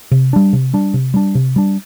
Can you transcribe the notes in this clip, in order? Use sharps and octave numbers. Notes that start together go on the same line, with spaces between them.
C3
G3 D4
C3
G3 D4
C3
G3 D4
C3
G3 D4